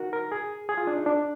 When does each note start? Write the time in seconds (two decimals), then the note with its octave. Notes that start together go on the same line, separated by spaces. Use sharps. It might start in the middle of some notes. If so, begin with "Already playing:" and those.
Already playing: D#4 F#4 A#4
0.13 A#4
0.32 G#4
0.69 G#4
0.77 F4
0.87 D4
0.97 D#4
1.06 D4